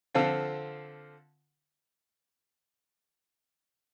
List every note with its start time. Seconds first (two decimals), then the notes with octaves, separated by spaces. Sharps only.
0.14 D3 F3 C4 F4 A4